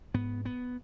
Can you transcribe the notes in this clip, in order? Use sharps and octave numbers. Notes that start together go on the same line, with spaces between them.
G#2 B3
B3